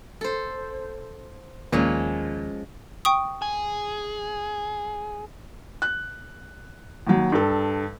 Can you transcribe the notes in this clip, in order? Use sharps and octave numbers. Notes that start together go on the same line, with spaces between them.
A4 C5
D#2 A#2 F3 G#3 C#4
G5 C#6 D#6
G#4
F#6
D#2 F#3
G2 A4